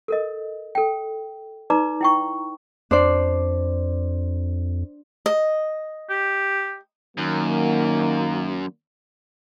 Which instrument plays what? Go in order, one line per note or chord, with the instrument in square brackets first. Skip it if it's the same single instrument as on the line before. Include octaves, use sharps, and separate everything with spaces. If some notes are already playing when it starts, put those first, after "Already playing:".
[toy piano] A4 A#4 D#5
A4 G5
D#4 B4 D5 A#5 D6
E4 G5 C#6
[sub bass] F2 [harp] D4 C5 D5
[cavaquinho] D#5
[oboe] G4
[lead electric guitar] F#2 [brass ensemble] D#3 F#3 A#3